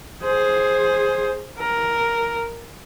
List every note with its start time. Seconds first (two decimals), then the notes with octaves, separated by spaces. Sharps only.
0.23 G#4 C5
1.58 A#4